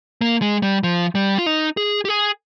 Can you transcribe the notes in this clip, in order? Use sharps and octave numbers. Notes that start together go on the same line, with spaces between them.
A#3
G#3
G3
F3
G3
F4
D#4
G#4
G4
G#4